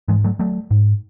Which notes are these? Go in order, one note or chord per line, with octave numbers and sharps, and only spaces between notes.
G#2 E3 G#3
F#3 A3
F#3 A3
G#2